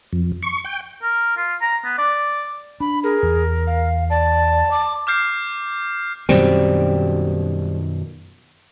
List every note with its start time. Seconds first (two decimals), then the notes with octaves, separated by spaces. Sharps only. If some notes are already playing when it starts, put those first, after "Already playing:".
0.13 F2
0.43 C#6
0.64 G5
1.03 A#4
1.37 F4
1.62 A#5
1.84 B3
1.98 D5
2.80 D4 B5
3.04 G#4 A#4
3.23 E2
3.67 F5
4.10 D5 A5
4.71 D6
5.07 D6 F6 G6 C7
6.29 F#2 B2 D#3 G3 C4